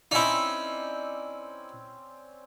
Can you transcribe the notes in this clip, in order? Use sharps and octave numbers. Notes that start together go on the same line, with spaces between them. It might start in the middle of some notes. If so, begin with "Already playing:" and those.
C4 C#4 D#4 E4 D5